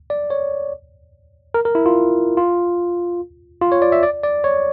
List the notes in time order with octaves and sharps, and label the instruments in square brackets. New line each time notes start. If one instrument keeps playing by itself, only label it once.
[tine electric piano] D5
C#5
A#4
A#4
E4
F4
F4
F4
C#5
D5
E5
D5
D5
C#5